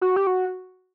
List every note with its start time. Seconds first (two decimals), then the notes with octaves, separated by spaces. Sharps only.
0.01 F#4
0.16 G4
0.27 F#4